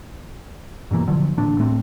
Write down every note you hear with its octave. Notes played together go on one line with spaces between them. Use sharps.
G2 B2 E3 A#3
D3 F3 F#3
D1 A1 A#2 D4
A2 A3 B3 C4